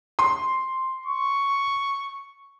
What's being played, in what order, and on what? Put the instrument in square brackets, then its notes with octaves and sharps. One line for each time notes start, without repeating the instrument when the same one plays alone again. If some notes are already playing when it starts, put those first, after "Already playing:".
[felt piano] C6
[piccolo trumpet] C#6